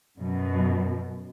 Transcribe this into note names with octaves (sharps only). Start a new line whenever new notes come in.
F#2 B2